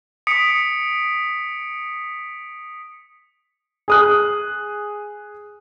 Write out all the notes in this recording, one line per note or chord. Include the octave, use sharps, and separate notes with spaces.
D#6 B6 C#7 D7
G#4 D#6 F#6